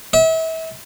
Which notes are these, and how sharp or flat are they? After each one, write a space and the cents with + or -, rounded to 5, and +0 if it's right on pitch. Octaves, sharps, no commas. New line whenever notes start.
E5 -35